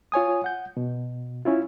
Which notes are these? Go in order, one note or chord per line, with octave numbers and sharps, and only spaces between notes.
F4 C#5 G#5 D#6
F#5 G6
B2
C#4 E4 F4